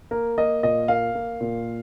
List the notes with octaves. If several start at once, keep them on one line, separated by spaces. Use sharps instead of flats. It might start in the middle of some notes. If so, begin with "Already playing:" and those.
A#3 A#4
A#3 D#5
A#2 D#5
A#3 F5
A#3
A#2